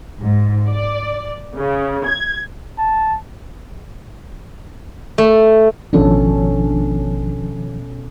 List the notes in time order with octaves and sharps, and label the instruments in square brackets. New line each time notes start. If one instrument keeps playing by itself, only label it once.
[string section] G#2
D5
C#3
G#6
[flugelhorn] A5
[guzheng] A3
[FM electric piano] A1 D4 [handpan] B2 C#4 A4 [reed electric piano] D#3 F3